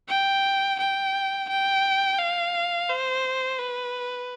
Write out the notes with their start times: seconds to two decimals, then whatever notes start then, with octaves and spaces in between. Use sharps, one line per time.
0.09 G5
0.79 G5
1.49 G5
2.18 F5
2.89 C5
3.59 B4